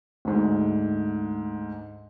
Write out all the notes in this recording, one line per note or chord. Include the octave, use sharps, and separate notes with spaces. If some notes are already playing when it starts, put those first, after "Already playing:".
D2 G#2